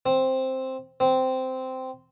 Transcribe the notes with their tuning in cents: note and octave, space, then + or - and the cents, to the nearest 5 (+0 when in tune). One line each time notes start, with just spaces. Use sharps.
C4 +5
C4 -10